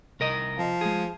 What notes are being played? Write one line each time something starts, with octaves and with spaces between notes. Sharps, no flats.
C2 A#4 D#5
F3
G#3 G#4